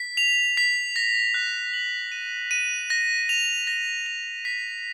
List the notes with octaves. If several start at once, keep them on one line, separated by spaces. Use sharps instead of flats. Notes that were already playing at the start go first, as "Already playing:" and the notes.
Already playing: B6
F7
B6
A#6
F#6
F#7
D#7
D#7
A#6
F7
A#6
F7
B6